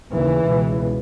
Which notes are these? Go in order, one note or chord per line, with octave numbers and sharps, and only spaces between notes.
D#2 C#3 E3
C#2 B2